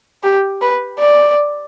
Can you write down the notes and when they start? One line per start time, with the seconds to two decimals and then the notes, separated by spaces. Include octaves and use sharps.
0.23 G4
0.62 B4
0.99 D5